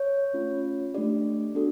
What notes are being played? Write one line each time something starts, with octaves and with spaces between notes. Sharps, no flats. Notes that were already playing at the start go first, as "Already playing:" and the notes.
Already playing: C#5
A3 C#4 F4
A3 D4 G4 D5
B3 D4 F#4 A4